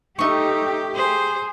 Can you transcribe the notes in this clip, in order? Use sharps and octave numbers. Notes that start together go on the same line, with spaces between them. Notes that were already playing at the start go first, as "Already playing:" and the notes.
A3 D#4 G4 C#6
G#4 C5